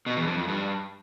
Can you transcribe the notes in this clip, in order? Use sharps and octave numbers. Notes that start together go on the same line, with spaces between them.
B2
E2
F2
F2
G2